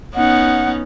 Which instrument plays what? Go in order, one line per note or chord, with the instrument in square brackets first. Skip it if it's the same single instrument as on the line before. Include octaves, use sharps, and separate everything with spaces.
[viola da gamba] B3 C#4 D#4 [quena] F#5